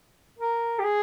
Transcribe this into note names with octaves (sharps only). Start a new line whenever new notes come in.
A#4
G4
G#4